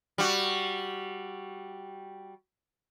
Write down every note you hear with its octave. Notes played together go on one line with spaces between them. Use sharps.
G3 F#4